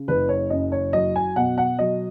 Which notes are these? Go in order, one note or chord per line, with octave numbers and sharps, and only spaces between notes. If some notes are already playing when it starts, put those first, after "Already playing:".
Already playing: C#3
F#1 B4
C#5
F#2 D#5
C#5
F#3 D#5
G#5
B2 F#5
F#5
F#3 D#5